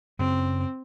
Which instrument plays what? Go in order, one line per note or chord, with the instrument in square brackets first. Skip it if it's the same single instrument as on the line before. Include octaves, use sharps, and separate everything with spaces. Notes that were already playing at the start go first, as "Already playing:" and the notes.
[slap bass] F#2 C#3 F#3 [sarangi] C4